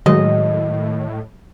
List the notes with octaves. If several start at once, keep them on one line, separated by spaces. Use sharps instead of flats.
A2 D#3 F#3 G#3 D#5